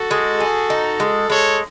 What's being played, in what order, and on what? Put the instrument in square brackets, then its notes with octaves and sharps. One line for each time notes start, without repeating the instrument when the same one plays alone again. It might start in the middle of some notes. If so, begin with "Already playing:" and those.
Already playing: [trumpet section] F#4 A4
[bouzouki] G#3
G#4
D#4
G#3
[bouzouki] G#3 [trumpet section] A4 C#5